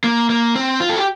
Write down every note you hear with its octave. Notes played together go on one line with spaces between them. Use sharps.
A#3
A#3
C4
F4
A4
G4